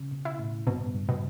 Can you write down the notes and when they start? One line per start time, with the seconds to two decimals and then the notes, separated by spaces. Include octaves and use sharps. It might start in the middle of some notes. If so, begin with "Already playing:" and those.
Already playing: C#3
0.11 B2
0.25 E4
0.39 A2
0.67 G2 B2
0.94 G2
1.09 B2